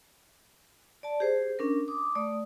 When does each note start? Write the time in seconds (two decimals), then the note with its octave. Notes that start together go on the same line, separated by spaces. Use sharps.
1.03 D5 A5
1.20 G4 G#4 C5
1.59 C#4 D4 A#4
1.88 D6 D#6
2.15 A3 D5 D#6